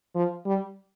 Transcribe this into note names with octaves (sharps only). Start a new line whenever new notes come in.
F3
G3